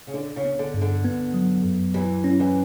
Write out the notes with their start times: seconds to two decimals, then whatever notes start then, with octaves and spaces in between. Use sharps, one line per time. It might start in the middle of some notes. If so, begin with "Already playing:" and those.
0.07 C#3
0.14 D3 D4
0.36 C#3
0.44 B3
0.59 D3
0.74 G2
0.81 D3
1.04 B3
1.34 F#3
1.65 F#2
1.94 E2 E3 G4
2.24 C#4
2.39 E2 E3